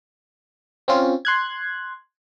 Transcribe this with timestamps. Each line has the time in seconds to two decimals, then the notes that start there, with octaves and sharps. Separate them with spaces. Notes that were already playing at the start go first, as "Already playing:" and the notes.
0.88 C4 C#4 F4
1.25 C6 F#6 G#6